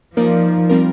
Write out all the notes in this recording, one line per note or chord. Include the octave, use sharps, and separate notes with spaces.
F3 A#3 D#4 A#4 D5
G3 C4 F4 A#4